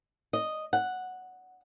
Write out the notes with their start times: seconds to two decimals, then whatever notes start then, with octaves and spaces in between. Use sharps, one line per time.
0.33 D#5
0.73 F#5